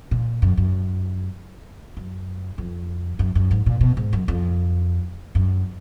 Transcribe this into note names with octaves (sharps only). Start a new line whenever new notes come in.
A#2
F#2
F#2
F#2
F2
F#2
F#2
G#2
A#2
B2
G#2
F#2
F2
F#2